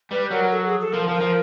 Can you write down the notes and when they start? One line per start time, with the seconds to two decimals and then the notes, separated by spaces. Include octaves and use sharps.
0.11 G3 B4
0.31 F#3 A#4
0.52 A4
0.66 G#4
0.80 A4
0.93 F3 A#4
1.08 F3
1.15 A#4
1.20 F3